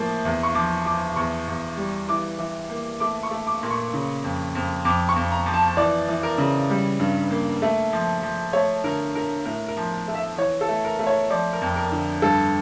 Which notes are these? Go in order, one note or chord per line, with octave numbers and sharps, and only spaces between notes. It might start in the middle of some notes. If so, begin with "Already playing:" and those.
Already playing: A2 F3 A#3
E2
C#6
F3 D6
F3 D6
E2 C#6
E2
G3
E3 D6
E3
A#3
A3 D6
C#6
A3
D6
A#2
C#6
C#3
F2
F2
F2 D6
C#6
F2
A#5
F3
A5
E3 D5
E3
A#4
C#3
G3
G2
A#3
A3
F3
F3
A3 C#5
D3 A#4
D3 A#4
A2 A#4
A#4
F3
A3
E5
E3 C#5
A4
A3
A#4
A3
C#5
F3 D5
A#4
F2
A#4
D3
G2 A4